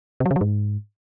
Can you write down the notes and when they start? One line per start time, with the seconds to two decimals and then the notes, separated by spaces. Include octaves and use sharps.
0.20 C3
0.26 F#3
0.31 C#3
0.36 F#3
0.41 G#2